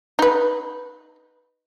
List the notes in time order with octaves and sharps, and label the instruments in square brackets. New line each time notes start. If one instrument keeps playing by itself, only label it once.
[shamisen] D#4 B4